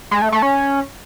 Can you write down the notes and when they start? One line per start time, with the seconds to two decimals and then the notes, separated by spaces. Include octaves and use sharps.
0.11 G#3
0.22 A3
0.32 A3
0.42 C#4